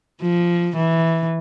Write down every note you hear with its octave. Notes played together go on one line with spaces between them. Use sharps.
F3
E3